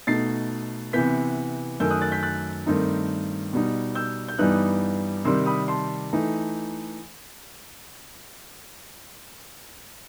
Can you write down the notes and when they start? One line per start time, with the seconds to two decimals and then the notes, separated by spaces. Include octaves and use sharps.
0.07 B2 A3 D#4 A6 C7
0.93 C3 E3 B3 G6 B6
1.80 F#2 D#3 A3 E6 G6
1.90 D#6 F#6
2.01 F#6 A6
2.12 G6 B6
2.23 F#6 A6
2.66 G2 D#3 A3 C4 D#4
3.53 B2 G3 D#4
3.95 E6 G6
4.28 G6
4.39 G2 E3 G3 B3 D#4 D#6 F#6
5.25 C3 D#3 G3 C6 E6
5.46 B5 D#6
5.68 A5 C6
6.13 E3 A3 D#4